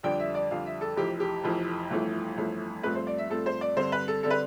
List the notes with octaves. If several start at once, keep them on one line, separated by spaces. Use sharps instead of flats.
F2 D3 G3 D4 G5
E5
D5
F2 D3 G3 D4 F5
E5
A4
F1 F2 E3 G4
G4
F1 F2 E3
G1 F2 E3 A3
G1 F2 E3 A3
G2 F3 A3 C4 B4
C5
D5
E5
G2 F3 A3 C4 A4
C5
D5
G2 D3 G3 C4 C5
B4
A4
D3 G3 C4 A4
B4